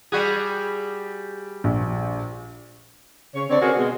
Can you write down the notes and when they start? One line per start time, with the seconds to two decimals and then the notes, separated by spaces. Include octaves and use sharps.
0.12 G3 F#4 G#4
1.64 A#1
3.35 C#3 C#5
3.50 D3 C4 C#5 D5
3.61 C4 F#4 G#4 A#4 B4
3.78 B2 G#3